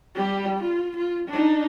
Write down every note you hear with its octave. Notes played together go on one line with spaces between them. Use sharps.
G3 G4
F4
F4
D4 D#4